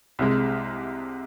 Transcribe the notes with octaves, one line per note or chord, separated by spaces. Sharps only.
C2 C3 G#3